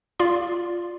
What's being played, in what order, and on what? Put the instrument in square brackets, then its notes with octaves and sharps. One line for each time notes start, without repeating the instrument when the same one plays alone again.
[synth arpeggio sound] F4 D5 C6